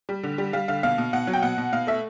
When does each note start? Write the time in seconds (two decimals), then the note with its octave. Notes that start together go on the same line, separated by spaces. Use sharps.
0.09 G3
0.23 D3
0.38 G3
0.53 G3 F5
0.68 D3 F5
0.83 B2 F5
0.98 B2
1.13 B2 F#5
1.27 F#3
1.33 G5
1.43 B2 F#5
1.58 B2
1.73 B2 F5
1.87 A3 E5